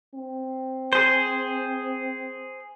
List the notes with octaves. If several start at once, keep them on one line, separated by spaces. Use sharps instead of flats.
C4
G#4 C5